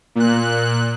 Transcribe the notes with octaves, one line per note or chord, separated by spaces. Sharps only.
A#2 F#6